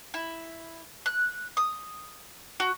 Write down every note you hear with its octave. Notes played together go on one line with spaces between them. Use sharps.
E4
F#6
D#6
F#4